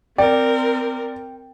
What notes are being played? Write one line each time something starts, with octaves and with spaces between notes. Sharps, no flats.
C4 A#4 D5 G5